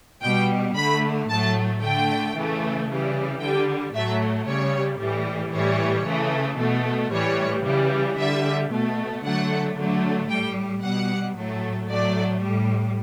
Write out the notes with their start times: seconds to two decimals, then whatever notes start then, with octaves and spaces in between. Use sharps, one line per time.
0.22 B2 G3 G5
0.76 D3 A3 B5
1.28 A2 F#3 A3 A5
1.82 D3 A3 G5
2.35 C#3 E3 A3
2.88 C#3 E3 G3
3.40 D3 G3 G5
3.94 A2 F#3 A3 E5
4.46 C#3 G3 C#5
4.99 A2 E3 G3
5.53 A2 E3 G3 C#5
6.05 C#3 E3 A3
6.59 B2 A3
7.11 A2 E3 G3 C#5
7.65 C#3 E3 G3
8.17 D3 G3 E5
8.71 B2 A3
9.24 D3 F#3 A3 F#5
9.77 D3 F#3 A3
10.29 A2 G3 G5
10.82 B2 G3 F#5
11.36 A2 F#3 A3
11.88 A2 F#3 A3 D5
12.42 A2 G3